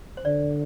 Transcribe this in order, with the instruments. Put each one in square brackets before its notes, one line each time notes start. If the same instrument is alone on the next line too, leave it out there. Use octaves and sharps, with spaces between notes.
[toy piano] C5
[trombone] D3 [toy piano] D5